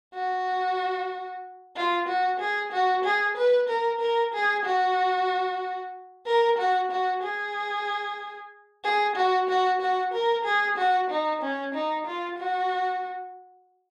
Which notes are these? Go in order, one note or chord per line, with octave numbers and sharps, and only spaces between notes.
F#4
F4
F#4
G#4
F#4
G#4
B4
A#4
A#4
G#4
F#4
A#4
F#4
F#4
G#4
G#4
F#4
F#4
F#4
A#4
G#4
F#4
D#4
C#4
D#4
F4
F#4